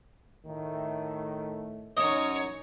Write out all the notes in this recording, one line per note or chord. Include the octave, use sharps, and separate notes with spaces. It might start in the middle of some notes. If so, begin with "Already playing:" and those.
A2 D#3 A3
F#2 C#4 D#4 C#5 D#5